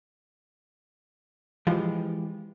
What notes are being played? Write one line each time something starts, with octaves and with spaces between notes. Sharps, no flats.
E3 F3 G#3 G4